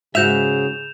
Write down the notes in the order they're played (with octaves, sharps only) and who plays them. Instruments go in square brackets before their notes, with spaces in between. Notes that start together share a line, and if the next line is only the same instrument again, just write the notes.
[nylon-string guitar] G#2 F#5 [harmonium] C#3 [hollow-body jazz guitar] F#4 E5 [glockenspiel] G6 E7 F7